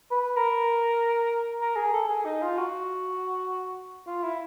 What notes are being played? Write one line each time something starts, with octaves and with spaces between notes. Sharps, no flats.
B4
A#4
A#4
G#4
A4
G#4
D#4
F4
F#4
F4
E4